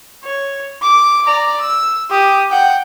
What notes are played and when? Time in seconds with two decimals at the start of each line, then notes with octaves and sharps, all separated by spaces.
0.24 C#5
0.82 D6
1.25 D5 A#5
1.61 E6
2.10 G4 D#6
2.50 F#5 G5